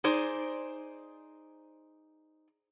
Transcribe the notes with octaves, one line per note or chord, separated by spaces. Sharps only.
D#4 G#4 C5 D5